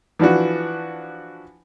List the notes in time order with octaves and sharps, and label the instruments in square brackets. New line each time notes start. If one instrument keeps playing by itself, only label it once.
[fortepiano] E3 F3 D4 F#4